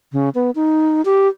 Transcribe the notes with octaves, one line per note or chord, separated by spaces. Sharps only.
C#3
B3
D#4
G4